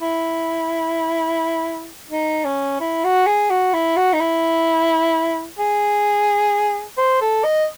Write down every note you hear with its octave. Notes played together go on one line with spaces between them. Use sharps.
E4
D#4
C#4
E4
F#4
G#4
F#4
E4
F#4
D#4
E4
G#4
C5
A4
D#5